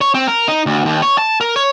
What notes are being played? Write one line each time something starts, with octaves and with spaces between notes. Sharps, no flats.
C#5
C4
A#4
D#4
D2
D#2
C#5
A5
A#4
C#5